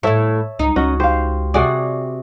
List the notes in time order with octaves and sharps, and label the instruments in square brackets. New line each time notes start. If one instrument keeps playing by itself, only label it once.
[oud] A2 E4 [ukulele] A4 C#5 E5
[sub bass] C#2 [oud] D#4
[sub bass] C#2 [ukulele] C#4 D#5 [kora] F#4
[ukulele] G4 F5 [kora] C5
[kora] C3 F#4 G#4 [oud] D5